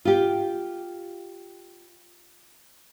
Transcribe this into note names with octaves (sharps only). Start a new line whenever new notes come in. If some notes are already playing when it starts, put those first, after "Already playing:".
F4 G4